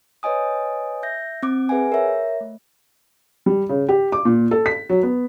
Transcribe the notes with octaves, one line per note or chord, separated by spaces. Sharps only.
B4 C#5 D#5 G#5 D#6
E5 G6 A#6
C4 D6
G#4 B4 E5 F#5 G#5
A#4 C#5 E5
A3
G3
C#3
G4
D6
A#2
A4
B6
F#3
B3